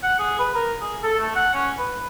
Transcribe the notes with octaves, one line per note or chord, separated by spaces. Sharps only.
F#5
G#4
B4
A#4
G#4
A4
A3
F#5
C#4
B4